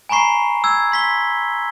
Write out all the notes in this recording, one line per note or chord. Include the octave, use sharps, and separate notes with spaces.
G#5 A#5 B5 C#6 C7
E6 G#6
C6 B6 G7